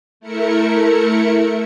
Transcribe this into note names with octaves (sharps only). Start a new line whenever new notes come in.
A3 E4 A#4 C#7